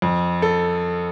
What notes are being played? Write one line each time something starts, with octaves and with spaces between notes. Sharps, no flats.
F2
A4